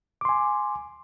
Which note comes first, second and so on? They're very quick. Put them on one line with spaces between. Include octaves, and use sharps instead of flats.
D6 C6 G#5